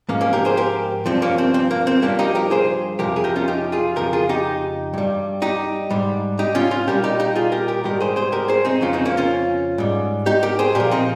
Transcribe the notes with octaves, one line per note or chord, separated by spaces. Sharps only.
G#2 F3 A#3 C#4
A#3 C#4
G4 A#4
G#4 C5
G4 A#4
G2 F3 C4
A#3 C#4
C4
C4
A#3
C4
G2 F3 A#3 C#4
D#4 G4
G4 A#4
G#4 C5
F2 C3 F3 G4 A#4
G#4
G4 A#4
C#4 F4
D#4 G4
F4 G#4
F2 C#3 F3 G4 A#4
F4 G#4
D#4 G4
G2 G3
D#4 G4
G#2 G3
D#4 G4
C#4 F4
C#4 F4
A#2 G3 G4 A#4
D#4 G4
D#4 G4
F4 G#4
G4 A#4
G4 A#4
G#2 D#3 G3 G4 A#4
G#4 C5
G#4 C5
G4 A#4
G#4 C5
C4 D#4
F2 C#3 F3 C#4 F4
C4 D#4
A#3 C#4
C#4 F4
G#2 G3
D#4 G4
G4 A#4
G#4 C5
A#2 F3 G4 A#4
C4 D#4